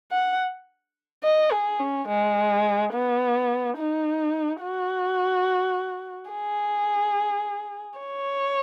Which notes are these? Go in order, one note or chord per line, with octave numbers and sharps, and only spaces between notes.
F#5
D#5
G#4
C#4
G#3
B3
D#4
F#4
G#4
C#5